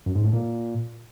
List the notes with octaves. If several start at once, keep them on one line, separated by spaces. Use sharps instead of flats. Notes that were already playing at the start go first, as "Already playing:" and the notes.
F#2
G#2
A2
A#2